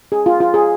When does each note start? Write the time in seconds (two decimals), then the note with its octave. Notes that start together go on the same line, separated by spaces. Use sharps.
0.12 G#4
0.26 F4
0.40 F4
0.54 G#4